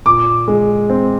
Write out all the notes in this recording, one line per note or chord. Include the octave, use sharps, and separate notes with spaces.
A#2 D6
G#3
C4